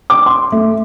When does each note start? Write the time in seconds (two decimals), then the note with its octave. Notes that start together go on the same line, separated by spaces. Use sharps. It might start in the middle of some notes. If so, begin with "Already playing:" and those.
0.10 D6
0.26 C6
0.52 A3